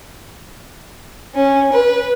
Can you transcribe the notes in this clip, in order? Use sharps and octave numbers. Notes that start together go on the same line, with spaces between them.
C#4
B4